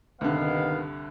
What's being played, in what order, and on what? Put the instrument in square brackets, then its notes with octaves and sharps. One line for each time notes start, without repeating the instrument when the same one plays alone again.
[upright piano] C2 G2 D3 [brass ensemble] D#3 B3 F5